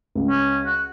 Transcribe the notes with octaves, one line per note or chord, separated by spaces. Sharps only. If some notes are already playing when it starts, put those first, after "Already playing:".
C#2
C#4
F#4